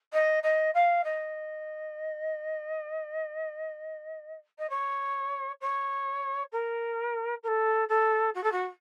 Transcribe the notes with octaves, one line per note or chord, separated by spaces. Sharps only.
D#5
D#5
F5
D#5
D#5
C#5
C#5
A#4
A#4
A4
A4
F#4
A4
F#4